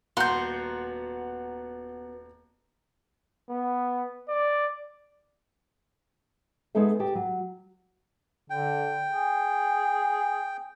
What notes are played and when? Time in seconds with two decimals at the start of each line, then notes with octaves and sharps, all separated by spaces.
0.17 D#1 B3 F#4 F#5 A#5 C6 G6
3.50 B3
4.29 D5
6.75 G#3 B3 D#4 A4 E5
6.99 G4 A5
7.15 F#3
8.50 D3 G5
9.12 G#4